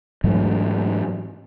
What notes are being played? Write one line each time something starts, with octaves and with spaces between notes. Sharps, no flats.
G#2 E3 F#3 A3